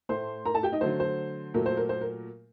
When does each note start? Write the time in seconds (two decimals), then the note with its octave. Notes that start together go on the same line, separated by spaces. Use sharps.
0.09 A2 A3 C5 C6
0.45 A#4 A#5
0.54 A4 A5
0.63 G4 G5
0.72 D#4 D#5
0.81 D3 F#3 A3 C5
1.00 C5
1.54 A#2 F#3 A3 A#4
1.66 C5
1.77 A#4
1.89 C5
2.01 A#4